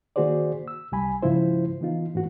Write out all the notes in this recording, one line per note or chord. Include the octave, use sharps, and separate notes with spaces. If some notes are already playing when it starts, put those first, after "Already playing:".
D#3 A#3 F#4 G#4 C5 D5
E6
C2 G3 G#5 B5
G#2 C#3 F3 E4 F4 C5
E3 B3 D#4 F4
G#2 E3 A#3 F#4